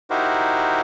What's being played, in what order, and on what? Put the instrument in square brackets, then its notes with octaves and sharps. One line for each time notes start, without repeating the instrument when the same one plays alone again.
[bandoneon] D#4 E4 F#4 G4 A#4 C5